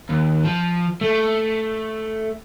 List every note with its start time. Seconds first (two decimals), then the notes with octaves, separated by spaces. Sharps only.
0.09 D#2
0.45 F3
1.01 A3